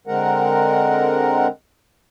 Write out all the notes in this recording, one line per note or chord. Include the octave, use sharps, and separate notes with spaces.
D3 G#3 C4 A#4 F#5 A#5